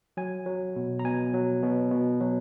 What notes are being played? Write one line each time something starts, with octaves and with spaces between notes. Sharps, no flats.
F#3 G#5
F#3
B2
A#5
B2 G#5
F#3
B2
B2
F#3